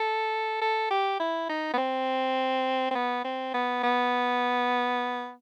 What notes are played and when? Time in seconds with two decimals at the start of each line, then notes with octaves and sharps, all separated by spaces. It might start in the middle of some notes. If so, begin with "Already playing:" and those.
Already playing: A4
0.62 A4
0.91 G4
1.20 E4
1.49 D#4
1.74 B3
1.78 C4
2.91 C4
2.95 B3
3.25 C4
3.54 B3
3.83 B3